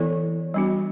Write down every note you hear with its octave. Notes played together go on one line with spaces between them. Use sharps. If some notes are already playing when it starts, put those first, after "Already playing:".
Already playing: E3 B3 E4 A4 D5
G3 B3 D4 F#4